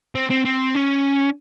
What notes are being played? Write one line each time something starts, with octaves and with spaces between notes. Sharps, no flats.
C4
C4
C4
C#4